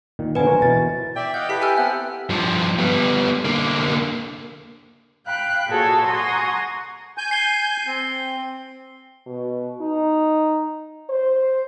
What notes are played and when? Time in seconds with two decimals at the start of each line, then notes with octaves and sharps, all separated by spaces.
0.19 A#2 D#3
0.35 D3 F3 B3 B4 G#5
0.47 A#4 C5 C#5
0.62 B2 E3 A6
1.16 D5 E5 G5
1.34 D#5 F5 F#5 G6
1.49 E4 G4 A4 B4 B6
1.61 G#5 E6 F6
1.78 B3 C4 E5 F#5
2.30 G2 F3
2.79 G3 B3
3.45 D3 A#3
5.26 F5 G5 B5 F#6 G6
5.68 A#2 F#4 G#4 A4 C#5 G#6
6.06 F#5 G#5 A#5 C6 C#6 D#6
7.18 G#5 G6
7.31 C7 G7
7.87 C4
9.26 B2
9.81 D#4
11.10 C5